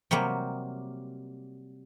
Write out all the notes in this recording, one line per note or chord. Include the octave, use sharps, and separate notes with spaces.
C3 F#3 G3 A#3